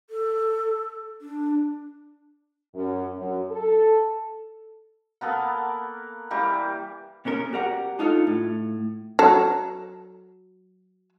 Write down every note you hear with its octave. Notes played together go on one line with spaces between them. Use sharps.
A4
D4
F#2
F#2
A4
A#3 B3 A4 A#4
E3 G3 A#3 G4
A#2 B3 C#4 A#4
F#4 G4 A#4 D5 F#5 A#5
D4 D#4 F4 F#4 A4
A2
F#3 A4